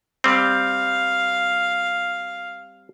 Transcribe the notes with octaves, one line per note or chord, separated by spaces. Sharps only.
G3 C4 F5